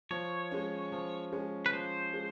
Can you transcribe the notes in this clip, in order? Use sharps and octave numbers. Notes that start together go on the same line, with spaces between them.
F3 C#5
G#3 C#4
F3
G#3 C#4
B4
F3 C5
G#3